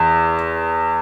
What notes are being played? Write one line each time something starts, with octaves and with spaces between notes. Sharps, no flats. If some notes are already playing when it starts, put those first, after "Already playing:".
Already playing: E2